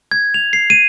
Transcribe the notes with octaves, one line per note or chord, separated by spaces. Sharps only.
G#6
F7
C7
D#7